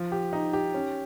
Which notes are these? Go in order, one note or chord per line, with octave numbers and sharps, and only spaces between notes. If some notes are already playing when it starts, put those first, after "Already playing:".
Already playing: F3
G4
D#4
G4
C#4